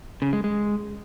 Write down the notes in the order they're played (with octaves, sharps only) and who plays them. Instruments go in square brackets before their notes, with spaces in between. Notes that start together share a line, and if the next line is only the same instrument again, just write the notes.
[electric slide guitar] C#3
G#3
G#3